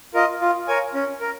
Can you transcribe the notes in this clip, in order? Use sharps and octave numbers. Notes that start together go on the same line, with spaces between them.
F4 A#4 D#5
F4
A#4 C#5 G#5
C#4
A#4